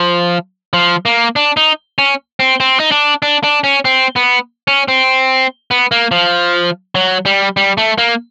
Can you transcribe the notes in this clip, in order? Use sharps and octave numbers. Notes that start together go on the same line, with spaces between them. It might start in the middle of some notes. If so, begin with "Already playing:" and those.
Already playing: F3
F3
A#3
D4
D#4
C#4
C4
C4
D#4
D4
D4
D4
C#4
C4
B3
C#4
C4
B3
A#3
F3
F#3
G3
G3
A3
A#3